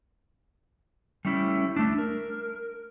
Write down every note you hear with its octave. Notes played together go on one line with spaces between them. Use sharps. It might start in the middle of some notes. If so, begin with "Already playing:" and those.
G3 A3 C#4 E4
A3 D4
A#4